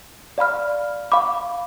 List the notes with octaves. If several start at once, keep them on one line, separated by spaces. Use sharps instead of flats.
D5 F5 B5 F6
F5 B5 D6